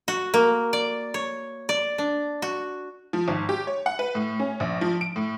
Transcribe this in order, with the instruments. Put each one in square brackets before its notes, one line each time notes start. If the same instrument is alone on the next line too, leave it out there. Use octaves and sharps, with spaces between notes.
[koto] F#4
A#3
D5
C#5
D5
D4
F#4
[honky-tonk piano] F3
G#1
G4
C#5
F#5
B4
A2
C#4
A#1
F3
D7
A2